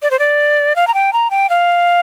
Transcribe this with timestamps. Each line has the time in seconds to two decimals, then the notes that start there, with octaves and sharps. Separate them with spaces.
0.02 D5
0.11 C5
0.19 D5
0.76 F5
0.87 A#5
0.94 G5
1.13 A#5
1.30 G5
1.49 F5